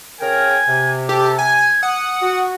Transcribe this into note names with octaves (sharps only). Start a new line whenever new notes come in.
C#3 A#4 G5 G#5
C3
G4 A4
G#5 G#6
F#5 D#6
F#4